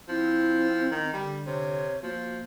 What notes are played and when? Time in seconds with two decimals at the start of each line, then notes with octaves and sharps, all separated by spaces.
0.09 F3 C4 E4
0.92 D#3
1.13 D3 G3
1.47 C3 C#5
2.03 F3 A#3 F#4